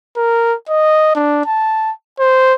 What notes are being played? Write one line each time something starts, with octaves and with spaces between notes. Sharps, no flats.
A#4
D#5
D4
A5
C5